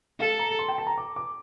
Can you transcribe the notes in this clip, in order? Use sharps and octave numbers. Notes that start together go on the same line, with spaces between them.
A4 F5
A#5
C6
G5
A5
A#5
D6
D6